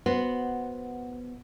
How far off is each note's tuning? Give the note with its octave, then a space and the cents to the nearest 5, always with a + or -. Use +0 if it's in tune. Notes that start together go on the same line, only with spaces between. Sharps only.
B3 +0 F#4 -5 C5 +0